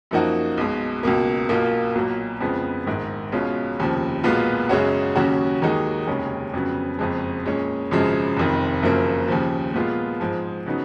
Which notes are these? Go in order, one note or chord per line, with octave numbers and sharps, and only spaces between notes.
F#2 F3 A#3 D#4 F#4
B1 B2 G#3
C#2 B2 A#3
B1 B2 A#3 F4
B1 A#2 F#3 A#3
F2 C#3 F3 G#3 B3
A#1 G#2 D#3
B1 B2 G#3 C#4 F4
F1 D#2 C#3 F3
B1 A#2 G#3 B3 F4
F#2 C#3 G#3 C#4 F#4
D#2 C#3 F#3 C#4 F#4
D#2 D#3 G#3 D#4 F#4
F1 D#2 C#3 G#3 C#4
F2 C#3 F#3 B3
F#1 F2 F3 G#3
A#2 G#3 C#4
G#1 F#2 C#3 F3 G#3
F1 F2 D#3
F#1 F#2 C#3 F3 A#3
D#2 C#3 F3
A#2 G#3 B3 F4
G#2 F3 G#3
C#3 F#3 B3 D#4